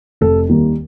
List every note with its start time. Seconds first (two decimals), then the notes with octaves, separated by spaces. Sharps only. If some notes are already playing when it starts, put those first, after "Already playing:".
0.21 F1 A4
0.49 D#2 D#3 G3 A#3